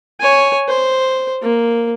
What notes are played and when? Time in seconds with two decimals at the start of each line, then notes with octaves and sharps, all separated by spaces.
0.20 C#5 G#5
0.68 C5
1.42 A#3